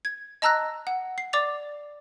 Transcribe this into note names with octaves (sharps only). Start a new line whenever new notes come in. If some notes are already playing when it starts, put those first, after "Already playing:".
G#6
D#5 A5 A#5 E6 F#6 A#6
F#5
C7
D5 D6 A6 F7